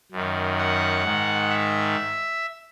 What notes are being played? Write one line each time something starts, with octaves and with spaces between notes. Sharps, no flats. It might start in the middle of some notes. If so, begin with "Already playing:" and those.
F#2 D#3
F#5
G#2 D#3
E5